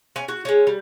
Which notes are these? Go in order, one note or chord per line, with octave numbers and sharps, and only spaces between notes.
C#4 G#5
F#4
G#3 C#4
G3